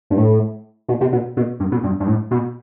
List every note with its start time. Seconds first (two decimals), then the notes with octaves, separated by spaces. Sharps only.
0.10 G2
0.18 A2
0.88 B2
1.01 C3
1.12 B2
1.37 B2
1.60 G2
1.72 B2
1.83 G2
2.00 G2
2.08 A2
2.31 B2